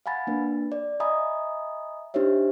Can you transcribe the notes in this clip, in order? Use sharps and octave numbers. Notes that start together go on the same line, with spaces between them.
F5 F#5 G#5 B5 A6
A#3 D4 B4
D5
D#5 E5 G#5 A#5 B5 D#6
D4 D#4 G4 C5 C#5 E5